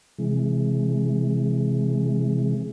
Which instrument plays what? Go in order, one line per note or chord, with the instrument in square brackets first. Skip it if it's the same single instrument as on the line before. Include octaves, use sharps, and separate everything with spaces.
[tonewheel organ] C3 E3 G#3